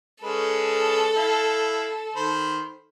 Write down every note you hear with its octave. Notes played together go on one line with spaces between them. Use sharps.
G#3 C#4 A4 B4
E4 F5
D#3 C5 B5